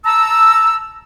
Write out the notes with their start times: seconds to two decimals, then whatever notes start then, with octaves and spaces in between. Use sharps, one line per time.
0.05 A5 A#5 E6